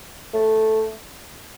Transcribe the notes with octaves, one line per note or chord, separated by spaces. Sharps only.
A3